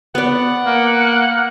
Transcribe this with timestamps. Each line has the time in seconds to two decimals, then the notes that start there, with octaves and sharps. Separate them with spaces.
0.15 B3 D5 F#5
0.66 A#3